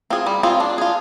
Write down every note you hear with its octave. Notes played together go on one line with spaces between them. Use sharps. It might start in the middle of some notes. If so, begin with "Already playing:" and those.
C4 F4 G#4
G3
C4 F4 G#4
D4
F4 G#4